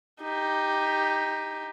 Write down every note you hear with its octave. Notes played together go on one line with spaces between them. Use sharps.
D#4 G4